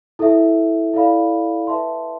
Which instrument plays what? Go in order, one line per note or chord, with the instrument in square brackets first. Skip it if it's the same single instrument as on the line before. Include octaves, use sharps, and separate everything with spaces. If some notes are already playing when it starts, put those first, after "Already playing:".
[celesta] E4 A4 E5
E4 A4 D5 F5 B5
B4 E5 A5 C6